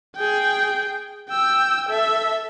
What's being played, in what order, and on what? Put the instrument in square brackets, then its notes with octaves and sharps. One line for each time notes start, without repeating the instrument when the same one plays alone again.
[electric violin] G#4 G5
G5 E6
A4 E5